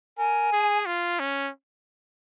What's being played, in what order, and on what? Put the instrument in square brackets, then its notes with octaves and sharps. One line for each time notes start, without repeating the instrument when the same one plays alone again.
[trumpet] A#4 [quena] G#5
[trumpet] G#4
F4
C#4